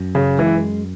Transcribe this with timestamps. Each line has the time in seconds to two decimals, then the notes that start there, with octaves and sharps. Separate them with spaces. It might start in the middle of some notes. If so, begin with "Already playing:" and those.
Already playing: F#2
0.15 C#3
0.39 E3 G#3